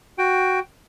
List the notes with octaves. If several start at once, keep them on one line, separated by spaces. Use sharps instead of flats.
F#4 G5